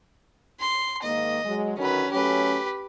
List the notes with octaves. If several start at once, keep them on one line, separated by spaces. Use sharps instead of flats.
C6
G#2 D#3 A#3 D#5
F#3 G#3
D3 D#3 F#3 C#4 B4
F#3 A3 C#4 G4 B4